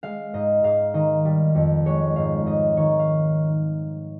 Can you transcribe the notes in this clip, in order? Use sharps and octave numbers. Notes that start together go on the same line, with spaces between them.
G#3 F5
G#2 D#5
G#2 F5
D#3 D#5
G3
F2
G#3 C#5
G#2 F5
G#2 D#5
D#3 C#5
F5